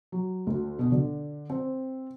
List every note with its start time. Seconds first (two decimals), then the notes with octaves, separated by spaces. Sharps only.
0.12 F#3
0.47 D2
0.79 B2
0.92 D3
1.50 C4